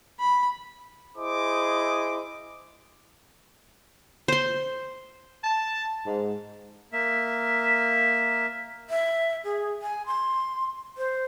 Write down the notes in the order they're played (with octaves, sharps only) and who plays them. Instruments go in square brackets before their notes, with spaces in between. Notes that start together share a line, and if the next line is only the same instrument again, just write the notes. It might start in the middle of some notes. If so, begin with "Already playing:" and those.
[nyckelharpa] B5
[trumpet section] E4 G#4 C5 D#5 D6
[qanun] C5 C6
[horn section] A5
G#2
[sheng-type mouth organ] A#3 E5
[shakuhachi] E5
G#4
G#5
C6
C5